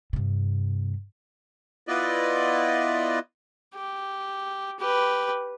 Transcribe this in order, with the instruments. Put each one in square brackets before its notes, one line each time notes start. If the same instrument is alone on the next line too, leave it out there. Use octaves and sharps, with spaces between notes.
[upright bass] G2 C3
[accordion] B3 E4 F4 B4 D5 D#5
[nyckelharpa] G4
G4 B4